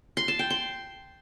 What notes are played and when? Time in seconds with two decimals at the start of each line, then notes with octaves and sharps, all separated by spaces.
0.17 C6
0.28 A5
0.39 G5
0.50 C6